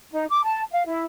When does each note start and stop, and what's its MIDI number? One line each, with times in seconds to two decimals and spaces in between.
0.12 0.25 63
0.30 0.41 86
0.44 0.63 81
0.72 0.83 77
0.87 1.03 64